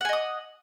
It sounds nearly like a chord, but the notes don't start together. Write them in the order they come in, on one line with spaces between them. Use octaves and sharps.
F#5 G#5 D#5 D#6